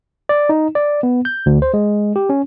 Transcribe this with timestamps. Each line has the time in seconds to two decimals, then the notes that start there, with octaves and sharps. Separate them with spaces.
0.29 D5
0.49 D#4
0.75 D5
1.03 B3
1.25 G6
1.46 D2
1.62 C5
1.74 G#3
2.16 G4
2.29 C#4